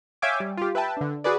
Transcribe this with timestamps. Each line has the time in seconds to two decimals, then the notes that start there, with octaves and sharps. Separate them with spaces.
0.22 C#5 E5 F5 G5 G#5 D6
0.40 G3
0.57 F4 G4
0.75 B4 E5 G5 A5
0.97 D3 D4
1.24 F#4 G#4 B4 D5